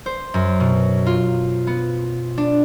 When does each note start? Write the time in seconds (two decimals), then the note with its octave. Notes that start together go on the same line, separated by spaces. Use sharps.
0.06 C5
0.34 F#2
0.60 B2
1.06 F4
1.67 B3
2.38 D4